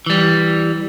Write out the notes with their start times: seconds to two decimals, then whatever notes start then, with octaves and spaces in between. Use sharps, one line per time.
0.06 E3 G3